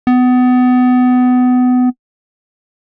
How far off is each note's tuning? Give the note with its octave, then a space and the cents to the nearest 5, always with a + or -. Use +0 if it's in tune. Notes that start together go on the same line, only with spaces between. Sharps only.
B3 +25